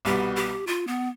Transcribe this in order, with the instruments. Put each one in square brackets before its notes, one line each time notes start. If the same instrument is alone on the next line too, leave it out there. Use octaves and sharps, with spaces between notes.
[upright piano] C2 B2 G3 B3 [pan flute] G4
[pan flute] G4
F4
B3